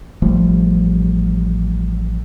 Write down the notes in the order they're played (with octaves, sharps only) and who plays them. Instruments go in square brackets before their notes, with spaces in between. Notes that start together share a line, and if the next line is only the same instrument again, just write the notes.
[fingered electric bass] A1 F3 G3 A3